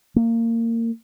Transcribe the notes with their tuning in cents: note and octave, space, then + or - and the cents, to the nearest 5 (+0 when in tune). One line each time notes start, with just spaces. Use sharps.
A#3 -25